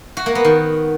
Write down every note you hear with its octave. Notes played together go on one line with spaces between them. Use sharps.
F#4
A#3
B3
D#3